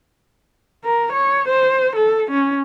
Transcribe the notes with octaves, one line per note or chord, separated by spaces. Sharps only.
A#4
C#5
C5
A4
C#4